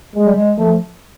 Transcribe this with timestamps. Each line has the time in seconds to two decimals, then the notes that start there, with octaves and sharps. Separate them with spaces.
0.15 G#3
0.26 G3
0.36 G#3
0.58 F3 A3